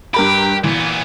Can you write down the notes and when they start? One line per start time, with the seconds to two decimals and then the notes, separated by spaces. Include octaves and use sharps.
0.14 G2 G4 A#4 B5
0.64 A#2 E3 B3